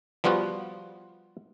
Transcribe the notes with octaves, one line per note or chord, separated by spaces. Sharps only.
F3 G3 B3 F4 F#4